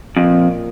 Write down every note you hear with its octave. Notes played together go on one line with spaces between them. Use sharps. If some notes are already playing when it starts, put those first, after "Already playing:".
F2 A#2